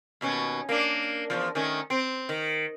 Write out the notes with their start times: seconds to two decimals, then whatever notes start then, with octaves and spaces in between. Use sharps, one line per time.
0.21 D#2 B2 C#4
0.69 A#3 D4
1.30 E2 G#2 F3
1.55 D#3 A3 C#4
1.90 C4
2.29 D#3